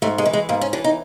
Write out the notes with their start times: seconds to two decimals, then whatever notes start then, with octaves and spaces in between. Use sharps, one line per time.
0.02 G#2 A3
0.18 G#3
0.26 E3
0.33 G#3
0.49 G#2 A#3
0.61 C#4
0.73 E3 D4
0.84 D#4